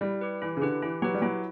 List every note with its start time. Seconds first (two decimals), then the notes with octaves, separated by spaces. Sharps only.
0.01 G3 E4
0.21 G4 B4
0.42 E3 E4
0.57 C#3
0.62 D3 G4 B4
0.82 E3 E4
1.02 F#3 G4 B4
1.14 G3
1.22 F#3 E4